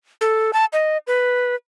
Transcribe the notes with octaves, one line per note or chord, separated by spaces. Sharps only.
A4
A5
D#5
B4